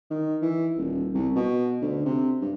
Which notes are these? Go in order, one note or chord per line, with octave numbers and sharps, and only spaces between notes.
D#3
E3
D#1
C2
B2
D2
C3
G2